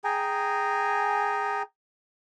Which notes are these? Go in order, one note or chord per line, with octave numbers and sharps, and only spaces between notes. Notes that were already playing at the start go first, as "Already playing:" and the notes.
G#4 G5 G#5 A#5